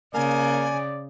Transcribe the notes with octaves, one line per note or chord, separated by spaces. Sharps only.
C#3 A#3 D5 G#5